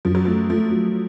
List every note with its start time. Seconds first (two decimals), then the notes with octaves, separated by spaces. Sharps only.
0.05 F#2 F3
0.15 F#3
0.25 F3 A3
0.49 F3 A3
0.71 F#3